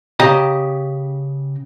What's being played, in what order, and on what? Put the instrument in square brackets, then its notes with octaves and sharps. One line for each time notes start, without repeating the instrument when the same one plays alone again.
[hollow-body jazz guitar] C#3 G4 D#5 A#5